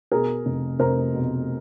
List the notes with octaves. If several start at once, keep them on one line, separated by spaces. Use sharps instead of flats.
B2 G#4 A#4
F1
F1 A#4 C5
B2